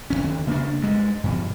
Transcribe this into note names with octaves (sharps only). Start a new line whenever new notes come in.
B1 G#2 C#4
D#2 D3
C#3 A#3 C4 D4
G2 G#3
G2 B2 F3